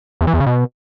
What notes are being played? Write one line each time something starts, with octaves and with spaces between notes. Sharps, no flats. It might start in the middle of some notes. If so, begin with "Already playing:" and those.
E2
E3
E2
C#3
B2